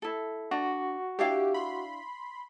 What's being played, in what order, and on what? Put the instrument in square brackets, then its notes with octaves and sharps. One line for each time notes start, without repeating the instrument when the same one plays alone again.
[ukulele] E4 A4
[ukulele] D4 [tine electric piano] F#4
[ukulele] D4 E4 F5 [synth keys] G4
[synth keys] B5 C6